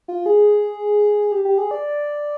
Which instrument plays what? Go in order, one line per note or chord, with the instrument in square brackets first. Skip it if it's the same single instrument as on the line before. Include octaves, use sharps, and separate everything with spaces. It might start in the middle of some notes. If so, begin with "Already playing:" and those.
[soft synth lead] F4
G#4
G4
G4
G#4
D5